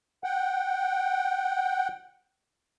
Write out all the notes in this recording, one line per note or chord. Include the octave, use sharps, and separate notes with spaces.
F#5 G5